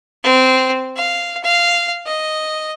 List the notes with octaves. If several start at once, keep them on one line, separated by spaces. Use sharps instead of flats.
C4
F5
F5
D#5